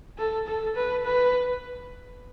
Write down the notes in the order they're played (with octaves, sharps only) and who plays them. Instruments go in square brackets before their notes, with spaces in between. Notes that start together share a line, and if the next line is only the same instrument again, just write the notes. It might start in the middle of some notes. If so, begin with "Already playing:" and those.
[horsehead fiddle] A4
A4
B4
B4